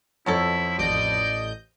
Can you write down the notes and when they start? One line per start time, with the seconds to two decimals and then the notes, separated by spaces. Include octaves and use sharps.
0.26 F2 B2 F#3 E4 A4 C#5
0.78 A1 D5 D#5 G6